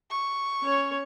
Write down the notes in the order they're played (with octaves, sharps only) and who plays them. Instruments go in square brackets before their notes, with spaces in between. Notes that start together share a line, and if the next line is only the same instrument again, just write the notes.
[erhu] C#6
[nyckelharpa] C#4 C#5